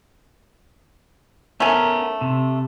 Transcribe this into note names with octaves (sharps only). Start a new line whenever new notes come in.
A3 B3 C#4 A#4 G#5
C3